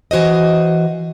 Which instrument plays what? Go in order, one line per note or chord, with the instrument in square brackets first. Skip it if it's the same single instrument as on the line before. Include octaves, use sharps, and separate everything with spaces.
[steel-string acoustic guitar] E3 F#4 C5 D#5